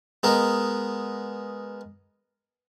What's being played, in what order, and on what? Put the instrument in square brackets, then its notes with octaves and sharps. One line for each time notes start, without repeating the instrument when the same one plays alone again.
[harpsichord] G#3 B3 A#4 D#5